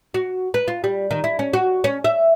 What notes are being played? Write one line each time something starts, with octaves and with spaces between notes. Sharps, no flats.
F#4
B4
F4
G3
D#3
E4
C#4
F#4
C#4
E5